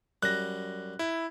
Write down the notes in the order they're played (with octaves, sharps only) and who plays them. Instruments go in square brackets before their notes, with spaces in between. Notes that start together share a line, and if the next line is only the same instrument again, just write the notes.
[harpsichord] F#2 G3 [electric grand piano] F#6 A#6
[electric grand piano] E4